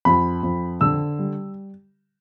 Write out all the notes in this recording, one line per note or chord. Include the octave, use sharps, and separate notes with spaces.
F2 B5
F2
D3 E6
G3